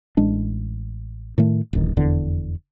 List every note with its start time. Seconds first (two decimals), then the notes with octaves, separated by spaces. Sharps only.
0.17 A1 G#3 D4
1.38 A2 D#3 A3
1.73 D1 A1 D#3
1.97 F1 E2 D3